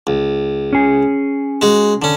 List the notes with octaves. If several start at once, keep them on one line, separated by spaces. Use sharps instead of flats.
C#2
C#4 G#4
G#3 F#4
D3 C#4